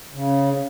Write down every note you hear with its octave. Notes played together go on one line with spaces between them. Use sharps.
C#3